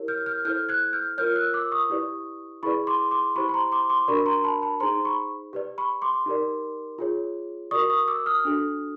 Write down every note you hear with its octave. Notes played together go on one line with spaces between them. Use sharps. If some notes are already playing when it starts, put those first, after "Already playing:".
Already playing: E4 G4 A#4 C#5
F6 G6
F6 G6
E4 A4 C5 F6 G6
F#6 G#6
F6 G6
F4 A#4 C#5 F6 G6
E6 F#6
D6 E6
C#6 D#6
E4 G4 B4 D5
E4 G#4 B4 D5 B5 C#6
C6 D6
C6 D6
E4 G4 C5 B5 C#6
B5
A#5 C6
C6 D6
C6 D6
D4 F#4 A#4 D5 B5 C#6
A#5 C6
A5 B5
A5 B5
D#4 G#4 C5 A#5 C6
B5 C#6
G4 B4 D5
B5 C#6
C6 D6
D#4 G4 A#4 D5
F4 G#4 C#5
F#4 A#4 D5 C#6 D#6
C#6 D#6
D6 E6
D#6 F6
D4 F#4 A4